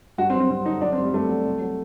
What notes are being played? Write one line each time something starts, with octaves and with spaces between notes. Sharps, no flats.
G2 F#4
C4
F#3
C4
G2 C4
D3 D#4
F#3 D4
C4
G2
G3
G2 A3
F#3
C2
F#3